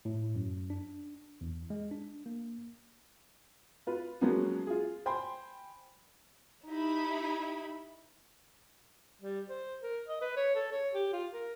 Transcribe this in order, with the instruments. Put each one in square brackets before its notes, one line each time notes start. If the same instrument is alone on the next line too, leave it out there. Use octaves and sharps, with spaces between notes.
[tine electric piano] A2
F#2
D4
E2
G#3
D4
A#3
[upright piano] F4 B4
F3 F#3 G#3 A#3 B3 C#4
F4 G#4
C5 G5 G#5 B5 C6
[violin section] D#4 E4 G4 E5 B5
[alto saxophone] G3
C5
A#4
D#5
B4
C#5
A4
C#5
G4
F4
A#4